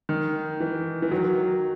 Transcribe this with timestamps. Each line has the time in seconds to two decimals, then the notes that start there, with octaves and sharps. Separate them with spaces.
0.09 D#3
0.60 E3
1.02 E3
1.11 D#3 F#3